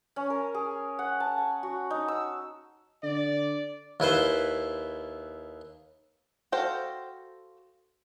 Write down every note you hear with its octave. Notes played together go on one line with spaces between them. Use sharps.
C#4
A#4
G#4
F#5
A5
G#5
F#4
D#4
E6
D3 D5
D#2 E4 B4 C5
F#4 A4 C5 F5 G5